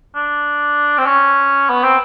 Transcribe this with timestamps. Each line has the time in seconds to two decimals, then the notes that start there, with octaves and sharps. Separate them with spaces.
0.15 D4
0.98 C4
1.06 C#4
1.70 B3
1.83 C4